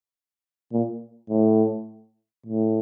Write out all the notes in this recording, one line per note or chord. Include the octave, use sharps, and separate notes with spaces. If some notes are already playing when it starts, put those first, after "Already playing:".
A#2
A2
A2